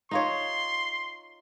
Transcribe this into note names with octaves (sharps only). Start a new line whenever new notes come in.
D#4 F4 C#5 C6